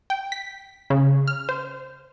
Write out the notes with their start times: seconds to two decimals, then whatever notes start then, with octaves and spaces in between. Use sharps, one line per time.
0.10 G5
0.32 B6
0.90 C#3
1.28 F6
1.49 C5